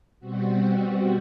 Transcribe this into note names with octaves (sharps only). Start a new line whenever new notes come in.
B2 G3 C4 F#4
F#4